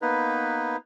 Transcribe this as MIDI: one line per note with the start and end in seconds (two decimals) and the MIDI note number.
0.02 0.77 58
0.02 0.77 59
0.02 0.77 63
0.02 0.77 71